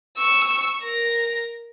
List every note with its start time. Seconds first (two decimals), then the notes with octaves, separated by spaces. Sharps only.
0.18 C#6 E6
0.82 A#4 A#6